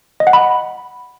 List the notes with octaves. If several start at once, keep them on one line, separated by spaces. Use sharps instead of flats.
D#5
F#5
B5